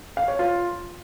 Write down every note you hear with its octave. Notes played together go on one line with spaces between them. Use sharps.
F5
C#5
F4